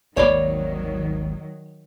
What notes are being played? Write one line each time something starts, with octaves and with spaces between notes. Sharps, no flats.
G#1 D#2 D#3 F#3 A#3 C#5 D5 B5